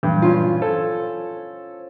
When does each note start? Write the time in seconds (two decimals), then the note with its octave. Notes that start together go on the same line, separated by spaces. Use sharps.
0.03 G2 A#2 E3 F#3
0.22 C#4 F4
0.62 A4 C5 G#6